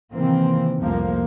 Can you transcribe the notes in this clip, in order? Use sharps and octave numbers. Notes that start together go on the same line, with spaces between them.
C3 D#3 E3 A#3 C4
F1 C2 F3 A#3